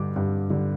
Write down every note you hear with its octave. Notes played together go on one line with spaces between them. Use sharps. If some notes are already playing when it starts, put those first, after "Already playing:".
Already playing: G2 D3 G3 D6
G2
D3 G3